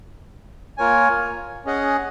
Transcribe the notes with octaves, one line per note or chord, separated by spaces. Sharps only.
A#3 F4 A#4 C#5 G#5
C#4 G#4 D#5 F#5